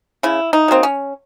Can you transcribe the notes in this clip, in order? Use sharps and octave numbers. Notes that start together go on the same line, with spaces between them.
C#3 E4
D#4
F#3 A#3 C4
C#4